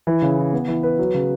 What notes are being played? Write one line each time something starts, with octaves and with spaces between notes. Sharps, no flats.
E3
C#3
E4
B3
E3
B4
F#3
C#3